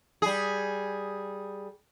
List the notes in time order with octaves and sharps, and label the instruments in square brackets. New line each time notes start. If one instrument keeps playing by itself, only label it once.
[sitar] G3 G#4